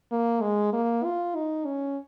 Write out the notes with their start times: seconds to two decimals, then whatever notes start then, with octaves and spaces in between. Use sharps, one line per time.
0.12 A#3
0.42 G#3
0.72 A#3
1.04 F4
1.35 D#4
1.65 C#4